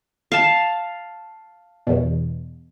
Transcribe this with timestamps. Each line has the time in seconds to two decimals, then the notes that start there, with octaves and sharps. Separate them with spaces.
0.32 F5 A5
1.87 E2 B2